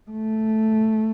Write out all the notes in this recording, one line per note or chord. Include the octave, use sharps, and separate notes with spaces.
A3